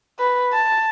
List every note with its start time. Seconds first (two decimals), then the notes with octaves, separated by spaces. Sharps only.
0.19 B4
0.53 A5